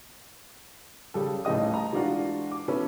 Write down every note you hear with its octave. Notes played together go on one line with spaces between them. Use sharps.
C#3 G3 A4
D#1 A2 C#3 D#5 D#6
A#5
E3 G#3 D4 F4 F#4
D6
E3 B3 C#4 E4 A4